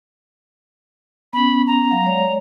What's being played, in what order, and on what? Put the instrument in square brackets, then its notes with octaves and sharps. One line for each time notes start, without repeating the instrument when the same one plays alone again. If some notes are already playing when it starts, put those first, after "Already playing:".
[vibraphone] B3 C#4 [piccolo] B5
[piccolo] A#5
[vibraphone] F#3 F5 F#5
G#3 C#5 D5